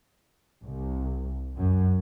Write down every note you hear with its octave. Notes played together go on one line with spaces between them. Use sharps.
C2
F#2